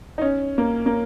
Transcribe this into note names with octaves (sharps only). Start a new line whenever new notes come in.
D#4
C#4
A#3
A#3